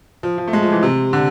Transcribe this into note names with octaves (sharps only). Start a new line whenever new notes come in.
F3
F3
A3
G#3
F3
E3
C3
D3